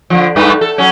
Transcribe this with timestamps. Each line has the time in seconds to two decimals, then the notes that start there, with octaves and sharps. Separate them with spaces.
0.10 D3 F3
0.36 G2 A3 B4
0.61 A4
0.78 F#3 C#4